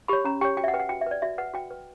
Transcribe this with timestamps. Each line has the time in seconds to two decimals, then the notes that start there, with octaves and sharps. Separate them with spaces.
0.08 G4 C#5 B5
0.25 C#4 A#5
0.41 G4 C#5 G5
0.57 F#4 G5
0.64 E5
0.68 F#5
0.74 B4 G5
0.80 F#5
0.89 F#4 G5
1.01 E5
1.06 B4 D5
1.22 F#4 E5
1.38 B4 F#5
1.54 F#4 G5
1.70 B4